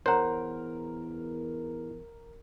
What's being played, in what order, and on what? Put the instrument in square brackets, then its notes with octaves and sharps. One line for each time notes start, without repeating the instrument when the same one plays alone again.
[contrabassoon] E2 [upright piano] A#4 [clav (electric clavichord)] C5 F#5 [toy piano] C#5 A#5